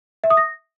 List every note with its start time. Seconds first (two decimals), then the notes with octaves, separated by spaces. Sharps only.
0.24 E5
0.30 D#6
0.37 A#6